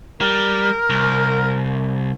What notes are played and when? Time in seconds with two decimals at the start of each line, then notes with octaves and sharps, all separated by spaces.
0.21 G3 A#4
0.90 C2